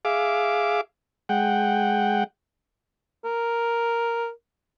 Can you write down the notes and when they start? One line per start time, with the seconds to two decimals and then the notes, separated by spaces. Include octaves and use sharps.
0.05 G#4 E5 F5 D6
1.29 G#3 F#5 G5
3.24 A#4